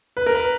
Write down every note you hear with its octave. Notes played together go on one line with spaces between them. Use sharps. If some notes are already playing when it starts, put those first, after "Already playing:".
B4
A#4
B4